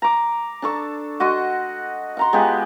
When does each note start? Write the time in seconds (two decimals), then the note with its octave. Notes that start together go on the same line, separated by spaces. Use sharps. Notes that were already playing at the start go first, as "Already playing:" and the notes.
0.02 A#5 D6
0.62 D4 A4 C#6
1.20 F#4 D#5 F#5 C6
2.17 F#5 A#5 C6
2.33 G#3 B3 F4 G4